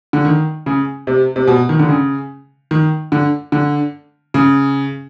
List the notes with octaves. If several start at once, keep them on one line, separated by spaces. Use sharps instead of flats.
D3
D#3
C#3
C3
C3
B2
D#3
D3
C#3
D#3
D3
D3
C#3